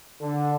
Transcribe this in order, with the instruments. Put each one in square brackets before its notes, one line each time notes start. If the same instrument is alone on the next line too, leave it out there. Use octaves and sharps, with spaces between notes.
[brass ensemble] D3